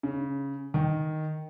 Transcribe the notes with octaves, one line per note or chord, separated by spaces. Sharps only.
C#3
D#3